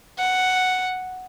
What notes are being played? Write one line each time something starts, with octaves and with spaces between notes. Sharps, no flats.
F#5